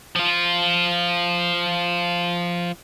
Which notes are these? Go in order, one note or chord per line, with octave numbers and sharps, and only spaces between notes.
F3 F4